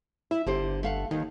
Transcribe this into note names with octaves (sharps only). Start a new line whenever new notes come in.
E4 E5
G1 D3 G4 C5
A3 F5 F#5
D#2 D#3